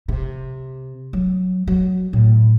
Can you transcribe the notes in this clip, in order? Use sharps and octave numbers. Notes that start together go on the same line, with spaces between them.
C3
F#3
F#3
A2